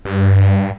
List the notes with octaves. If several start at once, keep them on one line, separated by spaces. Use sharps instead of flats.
G2